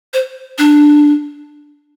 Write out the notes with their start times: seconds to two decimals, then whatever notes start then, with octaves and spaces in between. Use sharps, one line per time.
0.14 C5
0.58 D4